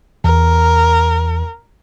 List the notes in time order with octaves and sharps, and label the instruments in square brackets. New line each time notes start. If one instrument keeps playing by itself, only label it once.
[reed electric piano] E2 [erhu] A#4